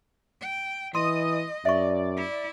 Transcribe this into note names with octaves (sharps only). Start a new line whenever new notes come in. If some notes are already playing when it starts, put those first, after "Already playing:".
G5
E3 D#5 C6 D#6
F#2 D5 E5 C#6
E4